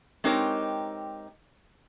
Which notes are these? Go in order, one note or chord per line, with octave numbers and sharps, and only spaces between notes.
G#3 C4 D#4 G4 A#4 C#5